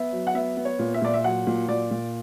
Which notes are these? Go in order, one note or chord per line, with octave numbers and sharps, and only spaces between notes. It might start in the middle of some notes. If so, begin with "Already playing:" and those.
Already playing: B3 E5
F#3
F#5
B3 E5
B3
C#5
A#2
E5
A#2 D5
E5
F#3 F#5
A#2
A#2 D5
A#2